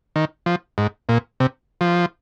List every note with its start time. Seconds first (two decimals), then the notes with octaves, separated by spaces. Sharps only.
0.16 D#3
0.46 F3
0.78 G#2
1.09 A#2
1.40 C3
1.81 F3